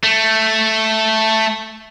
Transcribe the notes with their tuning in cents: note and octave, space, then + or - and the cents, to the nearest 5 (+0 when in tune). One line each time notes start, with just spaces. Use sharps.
A3 +0